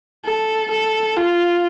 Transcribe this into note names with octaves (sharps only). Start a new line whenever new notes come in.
A4
A4
F4